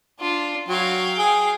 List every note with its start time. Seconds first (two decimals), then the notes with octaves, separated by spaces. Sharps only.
0.20 D4 F4
0.69 F#3 F5 G5
1.18 G#4